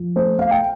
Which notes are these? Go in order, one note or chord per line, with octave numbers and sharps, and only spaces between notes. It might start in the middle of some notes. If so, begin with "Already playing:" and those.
Already playing: F3
A3 C5
A3 F5
G5